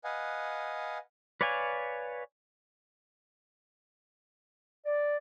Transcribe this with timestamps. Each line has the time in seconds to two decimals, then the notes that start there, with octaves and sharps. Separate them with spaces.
0.04 B4 D#5 F5 F#5 G#5
1.41 B4 C#5 D5 F5 G#5
4.86 D5